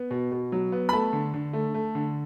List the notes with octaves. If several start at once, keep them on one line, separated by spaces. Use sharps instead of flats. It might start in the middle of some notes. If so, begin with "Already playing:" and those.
Already playing: B3
B2
B2
F#3
B3
B5
A3 A5
D3
D3
A3
A3
D3